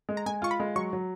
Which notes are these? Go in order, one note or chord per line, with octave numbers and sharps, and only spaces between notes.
G#3
A#5
G#3 G#5
F4 C#6
B5
G#3
F#3 C#6
F#3